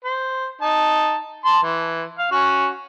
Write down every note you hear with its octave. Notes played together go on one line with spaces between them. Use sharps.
C5
D#4 A5
A5 C6
E3
F5
C#4 F#4